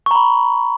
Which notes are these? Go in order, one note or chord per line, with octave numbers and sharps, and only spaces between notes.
A#5 B5 C#6